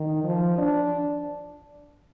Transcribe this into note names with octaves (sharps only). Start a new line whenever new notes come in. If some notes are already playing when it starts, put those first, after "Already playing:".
Already playing: D#3
F3
D4